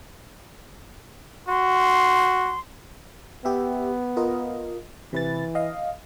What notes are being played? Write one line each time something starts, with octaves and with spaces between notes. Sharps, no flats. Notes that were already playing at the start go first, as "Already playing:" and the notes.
F#4 C6
B3 G4 E5
F4 A#4 D#5
C3 E3 B4 A6
D#5 F5